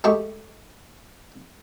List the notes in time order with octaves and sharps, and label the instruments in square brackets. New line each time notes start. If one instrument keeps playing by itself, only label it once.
[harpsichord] G#3 A3 G4 C#6